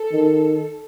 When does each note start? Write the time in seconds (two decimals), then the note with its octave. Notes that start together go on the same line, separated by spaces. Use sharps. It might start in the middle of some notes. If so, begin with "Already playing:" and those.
Already playing: A4
0.12 D#3